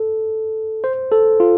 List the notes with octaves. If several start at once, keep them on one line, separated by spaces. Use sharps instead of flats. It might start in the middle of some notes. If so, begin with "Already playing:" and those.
Already playing: A4
C5
A4
F4